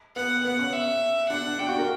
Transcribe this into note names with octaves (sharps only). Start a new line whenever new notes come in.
B3 F#5
B3 F#5
C#4
E5
D4 F#5
D4 G5
F#4
A#4